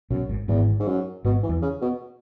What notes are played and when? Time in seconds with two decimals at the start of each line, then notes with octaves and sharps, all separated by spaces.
0.10 B1 F#2 B2
0.29 G#1 G#2
0.48 G#1 E2 G#2
0.80 G#2
0.87 F#2
1.25 G#1 G#2 B2
1.43 E3
1.49 E2
1.62 C#3
1.82 B2